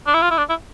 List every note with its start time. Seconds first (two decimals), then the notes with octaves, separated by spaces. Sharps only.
0.07 D4
0.14 E4
0.22 F4
0.31 E4
0.38 D4
0.50 E4